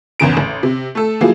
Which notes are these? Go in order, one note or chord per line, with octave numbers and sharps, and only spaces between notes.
G#1 E2 C#3 D7
A1
C3
A3 A4
F3 F#3 A#3 E4 G#4